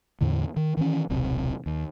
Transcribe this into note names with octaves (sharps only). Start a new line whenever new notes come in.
E2 A2 D3
D#3
D#3 E3 C#4
D#1 B1 C3
D#2